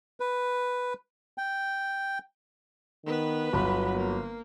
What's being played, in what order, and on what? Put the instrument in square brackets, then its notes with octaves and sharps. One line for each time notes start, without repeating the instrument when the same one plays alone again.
[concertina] B4
G5
[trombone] D#3 [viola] B3 B4
[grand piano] G1 B5 [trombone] F#3
[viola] A#3